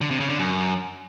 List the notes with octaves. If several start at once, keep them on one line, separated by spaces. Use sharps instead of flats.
D3
C3
C#3
D3
F#2